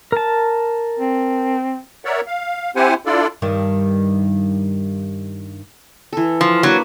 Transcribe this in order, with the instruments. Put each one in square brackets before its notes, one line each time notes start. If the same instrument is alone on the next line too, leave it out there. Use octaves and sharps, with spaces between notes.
[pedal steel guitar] A#4 A5
[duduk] C4
[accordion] A#4 C#5 D5 E5 F#5
F5
C4 E4 G4 C5 F#5 G#5
D4 E4 F4 A4 D5
[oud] G2 D#3
[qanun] E3 A4
[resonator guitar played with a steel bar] F3
[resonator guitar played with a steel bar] F#3 [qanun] A#3 D4 B4